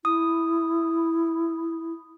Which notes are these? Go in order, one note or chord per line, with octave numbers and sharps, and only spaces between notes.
E4 D#6